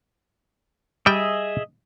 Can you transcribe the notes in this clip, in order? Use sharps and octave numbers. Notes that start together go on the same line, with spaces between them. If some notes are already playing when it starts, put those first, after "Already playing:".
G3 G#4 D#5 E5 G5